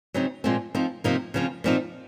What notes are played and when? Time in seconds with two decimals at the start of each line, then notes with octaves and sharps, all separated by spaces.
0.14 C#3 F#3 C4 D#4
0.44 A#2 F3 G#3 C4
0.75 F3 C4 D#4
1.04 C3 F3 A#3 D#4
1.34 C#3 F3 C4
1.64 A#2 F3 C4 D#4